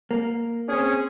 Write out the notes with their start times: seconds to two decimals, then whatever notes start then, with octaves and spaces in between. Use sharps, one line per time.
0.11 A#3
0.69 C4 C#4 G#4